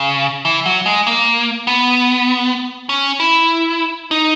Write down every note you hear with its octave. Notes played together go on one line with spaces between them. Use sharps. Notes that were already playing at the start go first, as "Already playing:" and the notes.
Already playing: C#3
E3
F#3
G#3
A#3
B3
C#4
E4
D#4